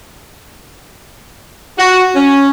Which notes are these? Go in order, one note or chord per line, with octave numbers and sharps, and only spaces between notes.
F#4
C#4